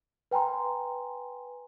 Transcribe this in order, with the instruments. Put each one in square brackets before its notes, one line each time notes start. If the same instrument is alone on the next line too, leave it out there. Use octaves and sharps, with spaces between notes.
[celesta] B4 G5 G#5 A#5 C6